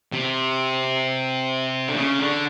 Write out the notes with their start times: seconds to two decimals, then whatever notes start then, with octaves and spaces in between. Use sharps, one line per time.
0.12 C3
1.88 D3
1.96 C#3
2.20 D3